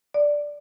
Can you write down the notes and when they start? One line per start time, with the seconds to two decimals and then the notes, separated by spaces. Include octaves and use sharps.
0.14 D5